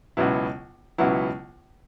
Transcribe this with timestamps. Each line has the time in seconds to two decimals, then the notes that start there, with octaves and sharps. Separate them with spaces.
0.17 C#2 B2 F#3 B3 E4
0.98 C#2 B2 F#3 B3 E4